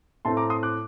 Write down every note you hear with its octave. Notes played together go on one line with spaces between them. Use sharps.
A2 A3 C4 A5 C6
A#5 D6
C6 D#6
D6 F#6